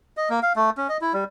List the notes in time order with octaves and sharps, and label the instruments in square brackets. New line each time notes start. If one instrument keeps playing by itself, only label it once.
[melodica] D#5
A#3
F5
A3
C#4
D#5
E4
G3